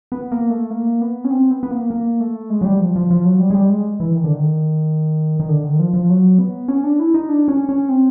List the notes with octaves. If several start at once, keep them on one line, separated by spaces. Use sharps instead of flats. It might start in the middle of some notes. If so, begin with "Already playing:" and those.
B3
A#3
A3
A#3
B3
C#4
C4
B3
B3
A#3
A#3
A3
G#3
F#3
G3
F3
F3
F3
F#3
G3
G#3
G3
G#3
E3
D#3
D3
D#3
D#3
D3
D#3
F3
F3
F#3
B3
C#4
D4
E4
D#4
D4
C#4
C#4
C4